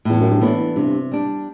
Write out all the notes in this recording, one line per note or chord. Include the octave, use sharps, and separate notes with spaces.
E2 A2
F#2
G2
A2 E3 B3 D4
G2 C3
G3 D4